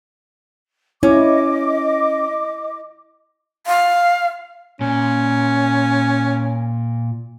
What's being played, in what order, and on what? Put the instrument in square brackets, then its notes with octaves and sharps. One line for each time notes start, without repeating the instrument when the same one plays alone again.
[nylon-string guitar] C#4 [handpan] E4 [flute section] D#5 D6
[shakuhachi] F5
[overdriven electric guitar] A#2 [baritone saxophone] C#4